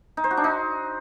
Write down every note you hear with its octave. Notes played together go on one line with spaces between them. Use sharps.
D#4
C5
F#4
D4
D#4